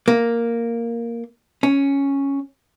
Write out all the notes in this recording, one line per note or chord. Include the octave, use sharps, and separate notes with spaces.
A#3
C#4